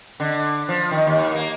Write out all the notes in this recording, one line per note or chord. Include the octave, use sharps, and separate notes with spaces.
D3
F3
D#3
D#2
A#3